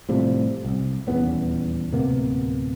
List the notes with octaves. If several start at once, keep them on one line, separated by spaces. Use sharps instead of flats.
A2 C3 F3 G3
C2
D#1 E2 B3 C#4
D1 C3 A#3 B3